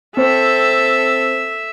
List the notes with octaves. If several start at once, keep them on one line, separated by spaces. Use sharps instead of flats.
C4 A4 C5 E5